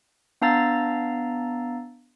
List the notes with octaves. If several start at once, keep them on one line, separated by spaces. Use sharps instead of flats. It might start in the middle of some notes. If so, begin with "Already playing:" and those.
B3 D4 F5 A#5 E6 A6